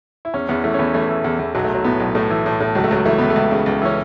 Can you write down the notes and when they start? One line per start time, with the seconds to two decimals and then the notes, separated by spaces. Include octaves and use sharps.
0.25 E4
0.34 E2 C#4
0.49 E2 B3
0.64 E3 A3
0.74 C#4
0.79 E2 B3
0.94 E3 A3
1.09 E3
1.24 E2
1.39 E2
1.55 B1 F#3
1.64 A3
1.69 B1
1.75 F#3
1.84 A2 B3
2.00 B1
2.15 A2 A3
2.30 E3
2.46 A2
2.60 A2
2.75 C#2 F#3
2.84 A3
2.91 C#2 F#3
3.06 E3 A3
3.18 C#2 B3
3.30 A3
3.36 C#2
3.51 C#3
3.66 C#2
3.82 E3 C#4